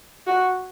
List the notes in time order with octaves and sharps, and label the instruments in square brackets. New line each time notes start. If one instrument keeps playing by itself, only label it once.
[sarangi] F#4